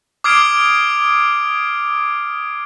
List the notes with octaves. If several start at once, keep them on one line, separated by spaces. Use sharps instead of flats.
D6 D#6 F6 G#6 C7 D7